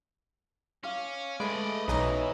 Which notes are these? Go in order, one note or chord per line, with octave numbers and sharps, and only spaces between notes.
C#4 F5 D6
G#3 A3 B4 D5 D#5
B1 E3 C#4 D#4 D#5